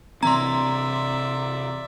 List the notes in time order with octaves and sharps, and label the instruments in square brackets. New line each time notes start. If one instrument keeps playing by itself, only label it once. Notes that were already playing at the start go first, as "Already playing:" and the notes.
[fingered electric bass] C3 E3 C4 [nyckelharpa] D5 E5 [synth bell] A#5 C6